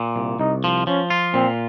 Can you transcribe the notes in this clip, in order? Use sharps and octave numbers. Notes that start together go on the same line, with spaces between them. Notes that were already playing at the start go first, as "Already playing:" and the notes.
Already playing: A#2
C2
C2 D#4
F3
F3 C#4
F4
A#2 C4